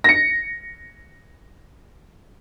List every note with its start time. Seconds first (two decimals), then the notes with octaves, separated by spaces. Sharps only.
0.04 A#6 C#7